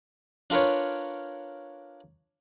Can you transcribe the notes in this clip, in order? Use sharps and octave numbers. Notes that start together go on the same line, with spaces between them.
D4 F4 A#4 B4 C#5